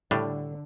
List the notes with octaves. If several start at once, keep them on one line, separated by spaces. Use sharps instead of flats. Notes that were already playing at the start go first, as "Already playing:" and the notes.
A2 D3 G3 D4